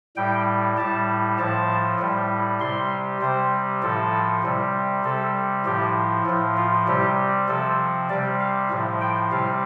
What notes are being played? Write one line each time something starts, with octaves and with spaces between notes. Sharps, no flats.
A2 G3 G5
A2 G3 A5
A2 F3 A5
A2 G3
C3 G3 C6
C3 G3 C5
A2 F3 A4
C3 G3
C3 G3 A4
A2 F3 G4
A2 F3
F4
C3 G3 G4
C3 F3 A4
C3 G3 D5
F5
A2 F3
G5
C3 G3 F5